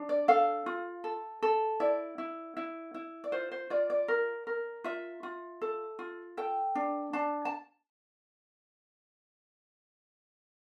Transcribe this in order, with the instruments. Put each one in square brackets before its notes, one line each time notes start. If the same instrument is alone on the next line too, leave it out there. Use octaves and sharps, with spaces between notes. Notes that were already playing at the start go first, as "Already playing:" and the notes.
Already playing: [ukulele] D4
D5
A4 F5
F4
A4
A4
E4 D5
E4
E4
E4
D5
F4 C5
C5
F4 D5
D5
A#4
A#4
F4 E5
F4
A4
F4
A4 G5
D4
D4 A5
A5